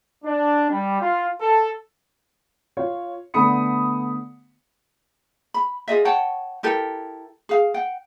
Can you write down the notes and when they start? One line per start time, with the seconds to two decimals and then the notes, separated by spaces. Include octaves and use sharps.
0.24 D4
0.70 G3
1.01 F4
1.41 A4
2.77 F4 C#5
3.34 D3 A3 B3 B5 D#6 C#7
5.54 B5
5.88 F4 G#4 D#5 E5
6.05 C#5 F#5 G5 A5
6.63 E4 G4 A4 A#4
7.49 G#4 F5
7.74 F#5 G5